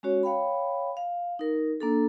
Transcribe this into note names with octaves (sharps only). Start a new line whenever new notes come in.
G#3 C#4 F#4 C#5
C#5 F5 G5 B5
F5
D#4 A#4
A#3 D4 A4